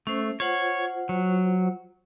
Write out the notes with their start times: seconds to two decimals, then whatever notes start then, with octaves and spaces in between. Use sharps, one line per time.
0.07 A3 C#4 C5
0.40 F4 C5 C#5 F#5
1.09 F#3